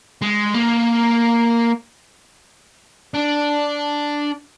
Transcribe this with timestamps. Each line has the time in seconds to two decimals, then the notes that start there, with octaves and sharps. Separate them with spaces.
0.22 G#3
0.54 A#3
3.14 D4